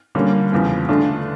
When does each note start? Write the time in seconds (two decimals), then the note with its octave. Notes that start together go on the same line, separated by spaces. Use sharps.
0.15 D3 G3 A#3 C#4 F4
0.52 E2 C#3 F3
0.88 D3 A3 D4 F4